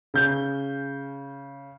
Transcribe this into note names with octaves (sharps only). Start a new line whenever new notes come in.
C#3 G6